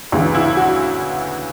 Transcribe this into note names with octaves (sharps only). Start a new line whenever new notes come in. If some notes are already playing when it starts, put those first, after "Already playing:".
D2 C#3 E3
E4
F#4